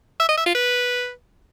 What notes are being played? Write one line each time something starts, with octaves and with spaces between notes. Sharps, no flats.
E5
D#5
E5
F4
B4